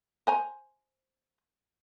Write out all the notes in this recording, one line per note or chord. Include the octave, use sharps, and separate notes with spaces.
C5 G#5 A#5